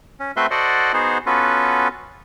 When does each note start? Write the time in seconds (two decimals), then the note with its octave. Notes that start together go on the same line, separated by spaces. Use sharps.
0.20 C#4
0.36 A3 C4 F#4 B4 E5 C6
0.51 F#4 A4 C5 D5 D#5 F#5
0.93 B3 D#4 F#4 G#4 C5
1.26 B3 C#4 F4 F#4 A4 B4